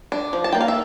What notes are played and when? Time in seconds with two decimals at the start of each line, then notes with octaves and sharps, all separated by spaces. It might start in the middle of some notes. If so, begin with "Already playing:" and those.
0.12 D4
0.33 F3
0.44 A5
0.53 A#3 G5
0.61 F5
0.68 E5